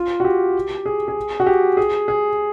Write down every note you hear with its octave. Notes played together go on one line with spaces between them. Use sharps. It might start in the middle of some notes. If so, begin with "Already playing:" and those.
Already playing: F4
F#4
G4
G#4
G#4
F#4
G4
G#4
G#4